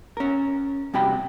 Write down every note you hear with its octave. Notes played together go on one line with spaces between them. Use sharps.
C#4 A#4
G2 C3 F#4 G5 B5